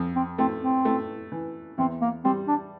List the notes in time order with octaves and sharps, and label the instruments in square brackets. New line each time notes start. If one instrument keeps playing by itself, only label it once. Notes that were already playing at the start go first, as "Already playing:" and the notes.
Already playing: [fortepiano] F2
[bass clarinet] C4
[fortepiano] A3 [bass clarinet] C4
[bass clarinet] C4
[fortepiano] A3
E3
[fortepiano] E2 [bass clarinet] C4
[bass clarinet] A#3
[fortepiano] G3 [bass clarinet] C4
[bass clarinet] D4